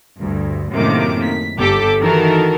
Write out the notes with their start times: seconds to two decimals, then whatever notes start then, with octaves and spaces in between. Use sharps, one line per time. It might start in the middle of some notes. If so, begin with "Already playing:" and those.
0.20 D2 G2
0.73 F#2 A2 C3 D#3 A#3 D6
1.24 B6
1.57 G1 G4 A4 D6 B6
2.00 D#3 E3 F#4 A4 A#4